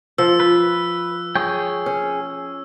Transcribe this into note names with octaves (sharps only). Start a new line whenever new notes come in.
F3 E6
B4
G#4 C#5 G5
C#4